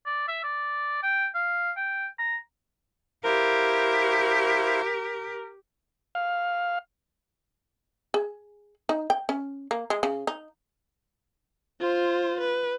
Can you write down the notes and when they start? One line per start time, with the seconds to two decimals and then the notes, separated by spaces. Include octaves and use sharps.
0.06 D5
0.28 E5
0.44 D5
1.03 G5
1.35 F5
1.77 G5
2.19 A#5
3.24 E4 G4 A#4 C5 F5
6.15 F5
8.14 G#4
8.89 D#4
9.10 G5
9.29 C#4
9.71 A#3
9.90 G#3
10.03 C#3
10.27 D#4
11.80 F4 C5
12.41 B4